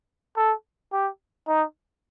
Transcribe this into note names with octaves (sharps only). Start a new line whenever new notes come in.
A4
G4
D#4